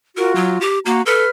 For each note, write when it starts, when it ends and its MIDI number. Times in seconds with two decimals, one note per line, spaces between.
0.17 0.61 65
0.17 0.61 66
0.17 0.35 70
0.35 0.60 54
0.61 0.79 67
0.86 1.01 58
0.86 1.01 66
0.86 1.01 82
1.06 1.25 69
1.06 1.29 71
1.06 1.29 89